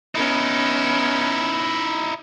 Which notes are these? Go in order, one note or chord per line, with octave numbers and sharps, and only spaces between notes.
B3 C#4 D#4 E4